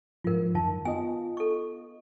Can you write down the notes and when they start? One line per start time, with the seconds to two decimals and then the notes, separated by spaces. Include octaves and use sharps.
0.24 G#2 F3 F4 A#4
0.55 F#2 D#3 F4 A5
0.85 B3 F4 D#5 G#5
1.37 A4 C#6